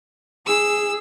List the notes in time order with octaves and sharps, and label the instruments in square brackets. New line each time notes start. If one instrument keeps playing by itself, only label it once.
[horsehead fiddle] G#4 [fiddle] E6